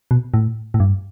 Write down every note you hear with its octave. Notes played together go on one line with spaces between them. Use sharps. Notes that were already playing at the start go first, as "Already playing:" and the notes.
B2
A2
A2
G2